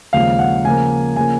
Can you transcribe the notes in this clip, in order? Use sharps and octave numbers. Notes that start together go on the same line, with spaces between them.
D#2 C#3 F3 G#3 F5
F#5
C#3 F3 A#3 G#5
C#3 F3 A#3 G#5